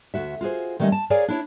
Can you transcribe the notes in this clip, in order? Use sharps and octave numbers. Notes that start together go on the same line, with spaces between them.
D2 F#4 E5
F4 F#4 G#4 C5
D#3 G3 A3 C#4 D#5
A5
G#4 A#4 C#5 D5 F5 G#5
D4 E4 C#5